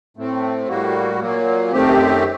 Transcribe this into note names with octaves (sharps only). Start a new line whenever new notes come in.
A2 A3 C4
A2 G3 A#3 F#4
A#2 F#3 A#3
F#2 D#3 A3 C4 G4